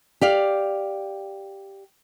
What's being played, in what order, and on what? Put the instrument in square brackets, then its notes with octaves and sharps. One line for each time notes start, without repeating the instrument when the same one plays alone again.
[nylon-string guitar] G4 D5 F5